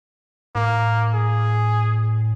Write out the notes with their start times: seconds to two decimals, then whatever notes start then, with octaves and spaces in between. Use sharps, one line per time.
0.55 A2 A#3
1.14 G#4